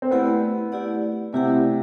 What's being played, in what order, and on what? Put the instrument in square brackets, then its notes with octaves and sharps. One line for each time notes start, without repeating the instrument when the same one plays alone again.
[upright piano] C4
[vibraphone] A3 E4 G4 D5 F#5 [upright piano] B3
[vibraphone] A3 E4 G4 D5 F#5
[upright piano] C3 [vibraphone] A3 E4 G4 D5 F#5